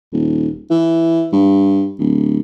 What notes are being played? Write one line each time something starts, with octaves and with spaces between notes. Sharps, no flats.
D#1
E3
G2
D1